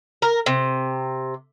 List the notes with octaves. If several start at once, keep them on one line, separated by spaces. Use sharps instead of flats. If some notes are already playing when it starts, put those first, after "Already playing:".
A#4
C3